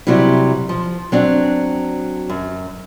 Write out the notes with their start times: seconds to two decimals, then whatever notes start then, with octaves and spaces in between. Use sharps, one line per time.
0.07 C3 F#3 G3 C4 E4
0.69 F3
1.12 F#3 C4 D4
2.30 F#2